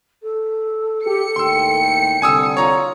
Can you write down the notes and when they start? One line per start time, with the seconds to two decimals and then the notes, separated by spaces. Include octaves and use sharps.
0.23 A4
1.06 G4 C#7
1.36 D#2 A2 G5 C6 E6
2.22 C2 D3 G#5 D#6 E6
2.57 F4 C#5 A#5